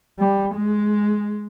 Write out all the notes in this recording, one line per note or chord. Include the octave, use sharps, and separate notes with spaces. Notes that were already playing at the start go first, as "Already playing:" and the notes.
G3
G#3